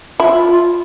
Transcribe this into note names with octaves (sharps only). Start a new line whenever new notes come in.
E4 F4